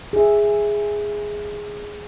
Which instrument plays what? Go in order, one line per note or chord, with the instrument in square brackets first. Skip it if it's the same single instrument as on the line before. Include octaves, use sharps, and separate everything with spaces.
[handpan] G#4 E5